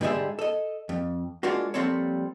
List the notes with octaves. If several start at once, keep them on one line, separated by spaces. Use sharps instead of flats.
G#2 D3 G3 G#3 G#4 E5
A4 D#5
F2
G#3 A#3 D4 F4 F#4
F3 G3 A#3 C4 A4 C#5